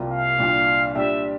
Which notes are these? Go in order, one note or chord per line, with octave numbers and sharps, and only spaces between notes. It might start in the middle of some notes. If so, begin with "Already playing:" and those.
Already playing: C2 C3 G3 A#3 F4
F5
C2 A#2 G3 D4
A#2 G3 D4 G4 E5